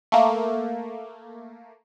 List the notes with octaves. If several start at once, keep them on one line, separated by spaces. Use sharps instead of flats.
A3 A#3